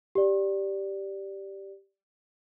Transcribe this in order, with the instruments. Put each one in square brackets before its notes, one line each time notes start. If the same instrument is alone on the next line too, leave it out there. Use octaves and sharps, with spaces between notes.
[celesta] G4 D5